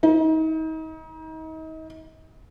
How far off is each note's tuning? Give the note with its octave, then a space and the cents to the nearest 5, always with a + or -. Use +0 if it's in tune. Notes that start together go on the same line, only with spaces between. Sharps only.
D#4 +35